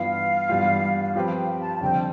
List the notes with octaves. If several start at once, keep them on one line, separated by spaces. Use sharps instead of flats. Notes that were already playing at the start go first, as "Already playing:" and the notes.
Already playing: G2 E3 B3 F4 F5
G2 E3 G3 B3 F4
F3 C4 G4 B4 G5
G5
A5
A5
F2 D3 G3 C4 G5